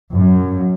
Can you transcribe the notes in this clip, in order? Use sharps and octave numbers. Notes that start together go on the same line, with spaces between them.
F#2